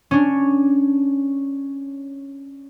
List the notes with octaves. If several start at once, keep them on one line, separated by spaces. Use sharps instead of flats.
C#4 D4